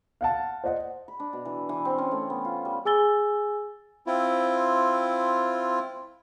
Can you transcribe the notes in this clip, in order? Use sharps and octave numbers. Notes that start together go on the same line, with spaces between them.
F5 F#5 A5
C5 D5 D#5 F#5
B5
D4
B2
E3
E3
C4
C#4
A3
B3
F4
G3
G#4 G#5 E6 A6 G7
C4 E4 F4